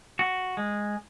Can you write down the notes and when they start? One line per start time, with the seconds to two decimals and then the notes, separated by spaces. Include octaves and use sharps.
0.19 F#4
0.57 G#3